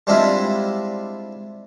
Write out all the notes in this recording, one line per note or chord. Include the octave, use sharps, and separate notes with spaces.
G3 G#3 C4 D4 E4 F4